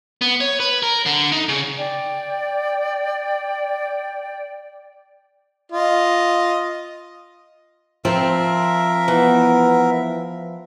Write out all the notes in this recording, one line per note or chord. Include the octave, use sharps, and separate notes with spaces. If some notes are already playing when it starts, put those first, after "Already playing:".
B3
C#5
B4
A#4
D3
D#4
C#3
D5 G5
F4 D#5
F3 C4 A#4 E5
E3 B3